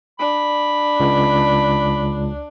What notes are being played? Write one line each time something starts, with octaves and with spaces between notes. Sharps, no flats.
D4 B5
C#2